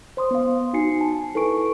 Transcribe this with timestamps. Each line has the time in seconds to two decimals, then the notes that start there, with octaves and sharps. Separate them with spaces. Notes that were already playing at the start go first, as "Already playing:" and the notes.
0.17 C5 C6 D#6
0.31 B3 F5
0.73 D#4 F#4 G#5 C7 C#7
1.01 G#5 A5
1.35 E4 A4 B4 G#5 C#6 D7